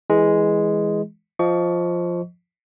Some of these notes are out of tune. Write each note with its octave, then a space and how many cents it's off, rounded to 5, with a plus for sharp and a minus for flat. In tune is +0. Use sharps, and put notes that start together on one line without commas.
E3 -10 G#3 +0
F3 +0 D#5 +0 C#6 +30